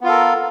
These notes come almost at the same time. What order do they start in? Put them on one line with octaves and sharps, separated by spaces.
B3 F4 F5 A4 A#4